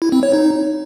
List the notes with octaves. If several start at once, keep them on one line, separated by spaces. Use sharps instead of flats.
E4
C4
C#5
D#4